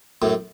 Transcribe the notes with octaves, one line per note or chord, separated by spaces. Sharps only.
F#2 A2